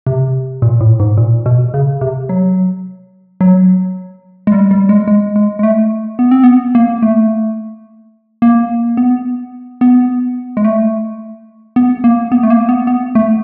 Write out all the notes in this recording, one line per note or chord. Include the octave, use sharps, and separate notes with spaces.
C3
A#2
A2
G#2
A#2
B2
C#3
C3
F#3
F#3
G#3
G3
G3
G#3
G#3
G#3
G#3
A3
B3
C4
B3
A#3
A3
A#3
B3
B3
G#3
A3
B3
A#3
B3
A3
A#3
B3
B3
A3